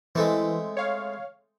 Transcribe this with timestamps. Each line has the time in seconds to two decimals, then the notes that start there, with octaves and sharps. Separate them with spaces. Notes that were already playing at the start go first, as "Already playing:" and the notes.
0.15 E3 G#3 A3 C4
0.77 C#5 F5